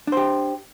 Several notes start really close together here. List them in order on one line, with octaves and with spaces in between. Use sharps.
D4 C5 G4